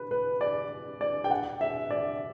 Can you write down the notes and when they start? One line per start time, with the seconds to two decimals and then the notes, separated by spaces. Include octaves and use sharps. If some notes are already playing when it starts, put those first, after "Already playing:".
Already playing: B4
0.11 B4
0.41 D5
1.01 D5
1.24 G5
1.31 F#5
1.61 E5
1.91 D5